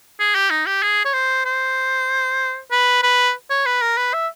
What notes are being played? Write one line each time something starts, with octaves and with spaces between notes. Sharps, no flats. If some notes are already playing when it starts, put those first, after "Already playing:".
G#4
G4
D#4
G4
G#4
C#5
C5
C5
B4
B4
C#5
B4
A#4
B4
E5